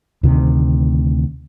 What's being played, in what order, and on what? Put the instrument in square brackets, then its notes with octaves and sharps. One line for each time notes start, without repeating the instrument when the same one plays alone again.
[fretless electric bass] D2 C3 D#3